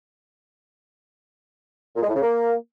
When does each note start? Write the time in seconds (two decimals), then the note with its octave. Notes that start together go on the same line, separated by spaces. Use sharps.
1.96 A#2
2.02 G#3
2.09 A2
2.15 C#3
2.22 A#3